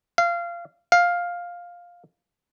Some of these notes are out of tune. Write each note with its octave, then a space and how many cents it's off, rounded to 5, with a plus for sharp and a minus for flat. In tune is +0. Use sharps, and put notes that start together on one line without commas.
F5 -20
F5 +10